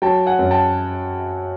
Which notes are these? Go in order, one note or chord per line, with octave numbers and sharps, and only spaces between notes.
F#3 G5 A5
F#5 G#5
F#2
G5 A5